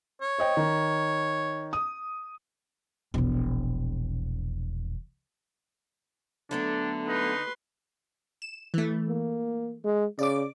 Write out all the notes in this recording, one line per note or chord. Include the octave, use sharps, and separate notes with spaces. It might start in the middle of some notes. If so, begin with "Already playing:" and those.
C#5
C5 D#5 G5
D#3
D#6
E1 A#1
D3 F#3 A3 B3 D4
D#4 B4 C6
E7
E3 A3
A#3
G#3
C#3 D5 D6